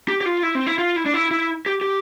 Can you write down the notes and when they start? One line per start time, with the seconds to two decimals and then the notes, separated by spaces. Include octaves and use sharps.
0.08 G4
0.21 G4
0.26 F4
0.43 E4
0.55 C4
0.67 E4
0.78 F4
0.96 E4
1.06 D4
1.14 E4
1.31 E4
1.66 G4
1.81 G4